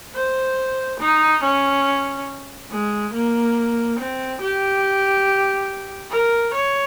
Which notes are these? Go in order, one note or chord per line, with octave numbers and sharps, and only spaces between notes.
C5
D#4
C#4
G#3
A#3
C4
G4
A#4
C#5